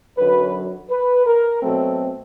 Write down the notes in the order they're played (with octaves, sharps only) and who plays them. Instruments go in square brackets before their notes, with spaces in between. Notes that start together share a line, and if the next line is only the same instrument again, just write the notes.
[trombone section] F#2 D3 F#3 B4
B4
A#4
B2 F#3 A3 C4 A4